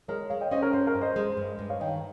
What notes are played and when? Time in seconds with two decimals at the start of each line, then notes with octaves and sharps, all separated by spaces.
0.08 G#3 A#4 C#5
0.30 G#3 C#5 F5
0.41 D#5 G5
0.51 C#4 C5 D#5
0.62 A#4 C#5
0.73 G2 C5
0.87 A#4
0.95 G2
1.02 C5 D#5
1.16 G#3
1.37 G2
1.59 G2
1.69 C#5 F5
1.80 D#3 D#5 G5